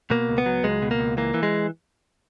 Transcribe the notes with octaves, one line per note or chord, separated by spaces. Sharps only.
B2 A#3
C#2
B3
F#3
C#2 G#3
B2
A#3
C#2
E3 A#3
E3
G#3